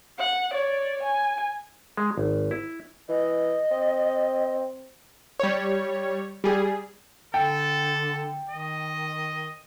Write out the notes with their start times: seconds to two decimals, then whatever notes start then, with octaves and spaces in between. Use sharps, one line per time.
0.19 F#5
0.52 C#5 D5
1.03 G#5
1.97 G#3
2.18 G#1
2.51 E4
3.09 E3 D#5
3.71 C4
5.40 G3 C#5
6.44 G3 G#4
7.34 D3 A4 G5
8.49 D#3 D#5